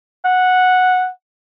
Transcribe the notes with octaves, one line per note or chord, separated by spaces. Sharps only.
F#5